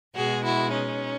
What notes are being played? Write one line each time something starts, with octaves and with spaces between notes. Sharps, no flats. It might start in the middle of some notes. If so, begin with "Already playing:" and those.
B2 G#3 F#4 G#4
E4 F#4
C#4 D#4